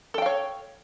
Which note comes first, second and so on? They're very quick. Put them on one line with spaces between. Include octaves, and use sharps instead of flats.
A4 G5 F5 C#5